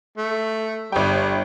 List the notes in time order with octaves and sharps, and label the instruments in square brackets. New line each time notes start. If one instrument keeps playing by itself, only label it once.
[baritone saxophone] A3
[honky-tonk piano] G1 G5 [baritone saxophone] G3